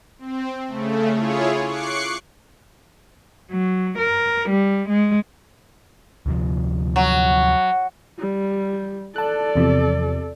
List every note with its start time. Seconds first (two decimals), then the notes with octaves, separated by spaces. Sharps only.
0.19 C4
0.68 C#3 A3
1.13 E4 F4 G#4 C#5
1.65 C#6 D6 F#6 C7 C#7
3.52 F#3
3.98 A#4
4.49 G3
4.89 G#3
6.26 D2 C3 F3
6.96 F#3
8.19 G3
9.16 A4 D5 A5 F#6
9.56 E2 C3 F3